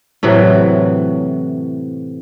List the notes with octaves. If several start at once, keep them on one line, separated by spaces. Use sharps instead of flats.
A2 C3 E3 F#3